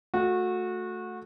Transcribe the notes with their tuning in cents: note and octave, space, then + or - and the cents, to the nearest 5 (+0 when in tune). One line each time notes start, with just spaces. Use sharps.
A3 +0 F#4 -25